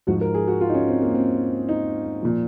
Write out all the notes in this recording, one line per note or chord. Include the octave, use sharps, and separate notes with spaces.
G#2 F3 F#4
A#4
G#4
F#4
F4
D#4
C#4
C4
A#3
C4
D#4
A#2 F3